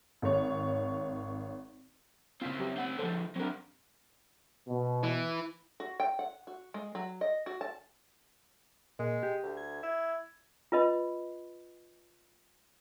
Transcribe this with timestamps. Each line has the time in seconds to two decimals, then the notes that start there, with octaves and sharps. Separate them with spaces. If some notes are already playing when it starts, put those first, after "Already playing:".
0.22 G#1 C#5
2.42 C#3 C4 E4 F4
2.60 F#3 G4
2.77 C4 F#5
2.98 D3 F3 A4 C5
3.36 F#3 C4 D4 A#4
4.68 B2
5.04 E3
5.80 F#4
6.00 G5
6.19 F#5
6.47 F#4
6.74 G#3
6.95 F#3
7.21 D#5
7.46 F#4
7.61 A5
8.99 A#2 G#3
9.23 G4
9.43 D2
9.57 G#6
9.83 E4
10.72 F4 B4 D#5 B5